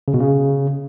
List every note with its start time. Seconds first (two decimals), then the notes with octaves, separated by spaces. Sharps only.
0.08 C#3
0.14 B2
0.20 C#3